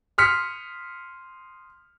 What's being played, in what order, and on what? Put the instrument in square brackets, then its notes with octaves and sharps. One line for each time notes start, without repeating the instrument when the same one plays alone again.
[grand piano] C6 D#6 F6 B6 C#7